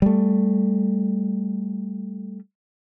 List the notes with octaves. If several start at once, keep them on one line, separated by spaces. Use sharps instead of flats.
G3 A3